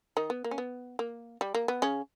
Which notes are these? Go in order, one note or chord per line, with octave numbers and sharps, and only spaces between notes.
D#3 D#4
B3
A#3
C#4
B3
A#3
G3
A#3
B3
C#3 C#4